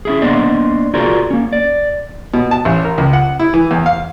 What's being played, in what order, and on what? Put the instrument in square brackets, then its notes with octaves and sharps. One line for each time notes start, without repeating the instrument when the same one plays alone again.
[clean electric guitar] C#4 E4 G#4
A#3 B3 D4 C5 D5 D#5
F4 F#4 G#4 A#4 C5 D5
A#3 C#4
D5
[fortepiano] B2
A5
A1
A#4
C#2
F#5
E4
E3
E2
F5